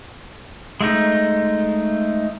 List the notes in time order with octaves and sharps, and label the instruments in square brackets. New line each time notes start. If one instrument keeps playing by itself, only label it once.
[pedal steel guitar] G#3 A3 D#4